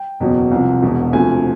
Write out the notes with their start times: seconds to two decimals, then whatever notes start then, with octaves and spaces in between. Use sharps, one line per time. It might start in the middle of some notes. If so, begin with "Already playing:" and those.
Already playing: G5
0.20 F#1 E2 B2 F#3
0.51 C2 C3 F3
0.82 E1 E2 B2
1.13 D2 C3 F3 G#5